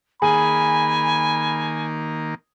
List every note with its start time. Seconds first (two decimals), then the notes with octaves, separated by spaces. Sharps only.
0.22 D#3 A#3 G#4 G#5 B5